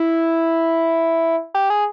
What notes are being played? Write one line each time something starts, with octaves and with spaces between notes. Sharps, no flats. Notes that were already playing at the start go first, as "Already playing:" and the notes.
Already playing: E4
G4
G#4